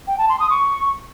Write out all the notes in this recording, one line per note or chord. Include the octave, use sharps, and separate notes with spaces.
G5
A5
C6
D#6
C#6